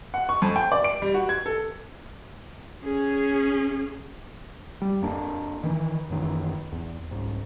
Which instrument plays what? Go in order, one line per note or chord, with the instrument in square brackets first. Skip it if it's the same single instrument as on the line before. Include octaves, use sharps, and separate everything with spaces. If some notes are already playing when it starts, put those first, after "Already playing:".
[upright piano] F#5
C#6
F2
G5
D5
D7
G3
F#4
G#6
A4
[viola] C#4 G#4
[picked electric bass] G3
F2 A#3 D4
D#3 E3
F#2 D#3 E3
E2
C2 G#2